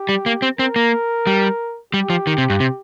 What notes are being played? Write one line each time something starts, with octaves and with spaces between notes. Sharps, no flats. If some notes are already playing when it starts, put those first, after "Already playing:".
Already playing: G4
G3
A#3
C4
C4 A#4
A#3
G3
G3 G4
F3
D#3
C3
G2
C3